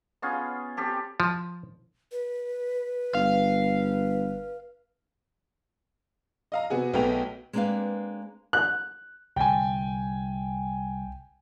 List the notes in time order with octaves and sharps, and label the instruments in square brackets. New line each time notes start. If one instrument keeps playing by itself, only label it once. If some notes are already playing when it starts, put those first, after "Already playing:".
[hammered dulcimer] B3 C#4 F4 G#4
C4 G4 A4
[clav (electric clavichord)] F3
[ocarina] B4
[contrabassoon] G1 [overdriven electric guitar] F5
[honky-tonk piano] D#5 F5 A#5
C3 B3 F#4 G#4
B1 A3 B3 G#4 G5 F7
[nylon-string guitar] G#3 A#3 C4 D4 B4 F5
[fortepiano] F#6
[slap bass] C2 D3 [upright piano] G5 G#5